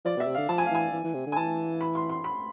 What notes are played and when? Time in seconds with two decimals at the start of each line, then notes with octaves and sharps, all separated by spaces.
0.05 F3 D5
0.17 B2
0.20 E5
0.27 C3
0.35 D3 F5
0.49 F3 A5
0.58 G#5
0.66 F5
0.71 E3 G#5
0.93 E3
1.04 E3
1.14 C3
1.26 D3
1.32 G#5
1.36 E3 A5
1.81 B5
1.95 C6
2.09 C6
2.24 B5